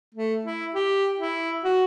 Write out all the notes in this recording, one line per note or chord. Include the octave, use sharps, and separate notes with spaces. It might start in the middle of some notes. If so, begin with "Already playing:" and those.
A3
E4
G4
E4
F#4